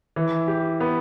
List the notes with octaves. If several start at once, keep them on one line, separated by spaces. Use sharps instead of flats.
E3
G4
B3